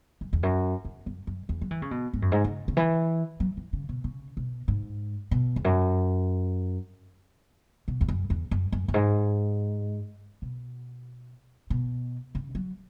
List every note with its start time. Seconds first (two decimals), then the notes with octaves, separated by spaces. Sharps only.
0.21 F#2
0.33 E2
0.43 F#2
0.85 E2
1.06 F#2
1.27 F#2
1.49 E2
1.61 F#3
1.71 E3
1.82 C#3
1.91 B2
2.13 G#2
2.22 F#2
2.32 G#2
2.44 C#3
2.68 C#3
2.77 E3
3.40 F#3
3.57 E3
3.73 C#3
3.89 B2
4.04 C#3
4.37 B2
4.68 G#2
5.31 B2
5.56 E2
5.65 F#2
7.88 B2
8.01 E2
8.08 F#2
8.30 E2
8.51 F#2
8.72 F#2
8.88 F#2
8.94 G#2
10.42 B2
11.70 B2
12.35 C#3
12.55 F#3